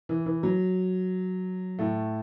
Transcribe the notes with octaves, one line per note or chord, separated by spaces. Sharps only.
E3
E3
F#3
A2 A3